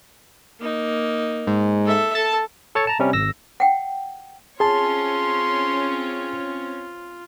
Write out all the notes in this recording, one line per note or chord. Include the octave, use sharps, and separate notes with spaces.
A#3 D#4
G#2
A4 E5
A4 A5
A4 C#5 A6 C#7
A5 A#5
C3 G3 C#4
G#1 E6 A#6
F#5 G5
C4 C#4 F4 G#4 C#5 A5 C6